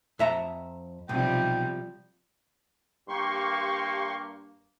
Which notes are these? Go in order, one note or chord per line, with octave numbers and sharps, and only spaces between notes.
F2 E5 A#5
B1 C3 F3 G3 G5
G2 A#3 G4 C6 C#6